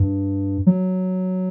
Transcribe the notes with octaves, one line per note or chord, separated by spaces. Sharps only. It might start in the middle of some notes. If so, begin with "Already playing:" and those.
Already playing: G2
F#3